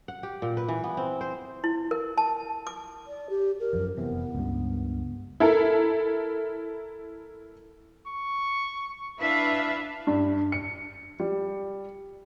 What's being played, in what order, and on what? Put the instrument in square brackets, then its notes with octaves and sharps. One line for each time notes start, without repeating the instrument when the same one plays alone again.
[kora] F#5
G4
A#2
B4
E3
B3
C4
C5
[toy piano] E4
A#4
A5
D6
[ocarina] D5
G4
A#4
[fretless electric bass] F#2 F3
[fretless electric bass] F1 E3 C4 [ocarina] B3
[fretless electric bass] C#2 G2
[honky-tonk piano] E4 A4 A#4
[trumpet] C#6
[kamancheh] D4 E4 [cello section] B4 E5 F5
[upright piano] G2
C#7
G3